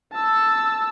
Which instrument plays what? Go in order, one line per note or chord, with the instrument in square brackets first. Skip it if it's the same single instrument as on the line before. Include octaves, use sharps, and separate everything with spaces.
[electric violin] A5 E6